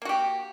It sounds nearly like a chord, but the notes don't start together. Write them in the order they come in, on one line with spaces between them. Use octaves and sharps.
A#3 F#4 G4